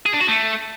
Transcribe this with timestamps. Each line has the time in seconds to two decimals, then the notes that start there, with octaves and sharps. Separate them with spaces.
0.06 G#4
0.13 D4
0.21 F#4
0.28 A3